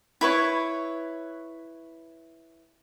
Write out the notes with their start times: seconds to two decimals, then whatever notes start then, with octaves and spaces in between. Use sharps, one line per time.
0.21 E4 B4 C#5